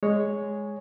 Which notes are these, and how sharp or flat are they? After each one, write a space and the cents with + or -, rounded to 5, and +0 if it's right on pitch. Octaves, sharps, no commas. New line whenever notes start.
G#3 +0 C#5 +5